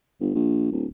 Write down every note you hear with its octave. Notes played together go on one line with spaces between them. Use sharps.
G1
A#1
D1